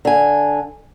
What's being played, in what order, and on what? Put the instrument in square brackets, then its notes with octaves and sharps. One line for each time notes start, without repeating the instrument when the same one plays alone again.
[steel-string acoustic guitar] D3 G#5